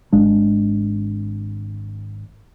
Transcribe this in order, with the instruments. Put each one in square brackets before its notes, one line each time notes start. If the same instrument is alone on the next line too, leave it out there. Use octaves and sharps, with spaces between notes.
[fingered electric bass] G#1 G#3 D4